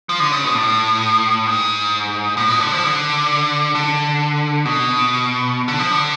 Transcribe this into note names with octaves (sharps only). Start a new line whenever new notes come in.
F3
D3
C#3
B2
A2
G#2
A2
B2
D3
F3
D3
D3
B2
D3
F3
D3